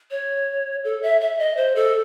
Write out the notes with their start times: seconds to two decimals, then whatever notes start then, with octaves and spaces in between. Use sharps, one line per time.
0.11 C#5
0.84 A4
1.03 E5
1.21 E5
1.39 D#5
1.57 C5
1.76 A4